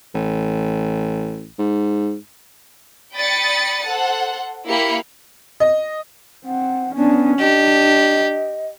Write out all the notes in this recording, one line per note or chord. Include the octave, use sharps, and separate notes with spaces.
A1
G#2
D5 G5 B5 D#6 A6 C#7
A4 C5 F#5
A#3 E4 G4 F5 B5 C#7
D#5
C4 F#5
B3 C#4 D4
D4 G4 D#5